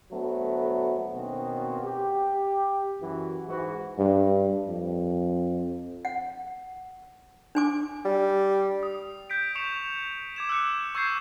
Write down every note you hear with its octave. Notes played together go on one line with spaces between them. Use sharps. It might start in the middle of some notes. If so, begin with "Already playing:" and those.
D2 F#3 A3 B3
B2 D#3 A#3 C4 C#4 F#4
G4
F#2 E3 F#4
G#2 E3 F#4
G2
F2
F#5
D4 G#5 D6
G3
D#6
G6 B6 D7
C#6 C#7 E7 F7
D6 G#6 E7
E6 F#6 C#7
C#6 E6 G6 G#6 C7 E7